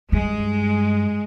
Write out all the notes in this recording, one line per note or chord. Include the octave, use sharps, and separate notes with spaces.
G2 G#3